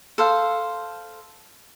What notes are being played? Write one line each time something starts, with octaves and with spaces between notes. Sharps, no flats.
A4 C5 F5